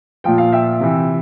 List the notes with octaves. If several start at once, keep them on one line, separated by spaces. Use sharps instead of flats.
A#2 F3 G5
F5
E5 G5
C3 E3